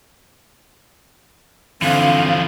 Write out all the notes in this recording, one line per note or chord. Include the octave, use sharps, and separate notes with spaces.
D3 E3 F3 C4 F5